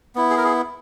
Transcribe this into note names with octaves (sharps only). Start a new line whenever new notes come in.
B3 E4
G#4
A#4
G#4